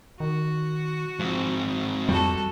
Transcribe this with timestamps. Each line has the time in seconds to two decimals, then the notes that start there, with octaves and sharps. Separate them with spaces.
0.20 D#3 F#4
1.19 G#2 F3 C4
2.09 F2 G3 F#4 A4